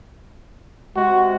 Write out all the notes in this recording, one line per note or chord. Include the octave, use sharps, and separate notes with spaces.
C3 G#3 F#4